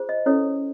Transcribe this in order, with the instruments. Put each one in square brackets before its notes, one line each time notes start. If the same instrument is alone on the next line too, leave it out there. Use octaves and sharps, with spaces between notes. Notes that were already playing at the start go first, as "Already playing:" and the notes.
Already playing: [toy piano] F4 G#4 C5
D#5
C#4 E4 A4 C#5